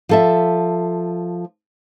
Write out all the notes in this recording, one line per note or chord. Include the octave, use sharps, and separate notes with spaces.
F3 A4 E5